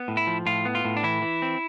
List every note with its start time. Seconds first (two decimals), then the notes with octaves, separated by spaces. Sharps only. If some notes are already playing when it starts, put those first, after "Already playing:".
Already playing: B3
0.08 A2
0.17 E4
0.27 F3
0.46 A2 F4
0.65 B3
0.75 F4
0.85 A2
0.97 D4
1.03 E3 E4
1.22 E3
1.42 C4